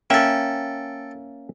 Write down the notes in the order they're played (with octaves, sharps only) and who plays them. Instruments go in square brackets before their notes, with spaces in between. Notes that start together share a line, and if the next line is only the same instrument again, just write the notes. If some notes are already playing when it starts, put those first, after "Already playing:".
[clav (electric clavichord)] A#3 C#4 E5 [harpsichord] A4 G5